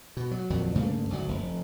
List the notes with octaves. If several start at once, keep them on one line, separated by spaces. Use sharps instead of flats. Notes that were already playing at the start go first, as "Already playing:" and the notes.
B2
F#3
A#1 F2 D#3 F#3
G2 C#3 A3 A#3
G#1 D2 D#3 F#3
F1